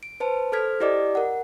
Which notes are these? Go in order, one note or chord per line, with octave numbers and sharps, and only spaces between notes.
D7
B4 C5 A5
A4 C5 F6 G#6 B6
E4 G4 D5 D#5 D6
A#4 F#5